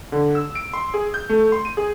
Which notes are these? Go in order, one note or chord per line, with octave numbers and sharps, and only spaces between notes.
D3
E6
D7
C6
G#4
G6
A3
C6
D#7
G#4